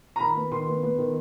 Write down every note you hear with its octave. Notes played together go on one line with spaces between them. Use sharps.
A#5
D#3 B5
B3
D#3 C6
B3
B3
D#3